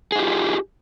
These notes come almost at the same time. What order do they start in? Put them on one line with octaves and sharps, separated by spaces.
G#4 D#4 G4 F4